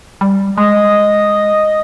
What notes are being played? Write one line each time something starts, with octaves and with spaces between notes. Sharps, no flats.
G3
G#3 D#5